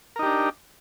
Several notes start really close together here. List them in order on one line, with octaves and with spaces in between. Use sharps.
A#4 D#4 G4 D4